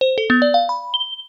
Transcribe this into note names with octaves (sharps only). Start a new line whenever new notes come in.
C5
A4
B3
D5
F5
B5
G7